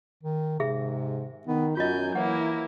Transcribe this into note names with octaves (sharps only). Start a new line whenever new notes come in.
D#3
G#2 C3 G#4 E5
D#3 B3
F#2 F#3 F4 D#5 G#5 G6
E3 A#3 E4 C#5 F#5